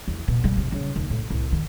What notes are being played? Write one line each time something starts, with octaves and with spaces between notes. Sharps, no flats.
E2
B2
G3
C3
C#3
D#2
A2
C2
D#3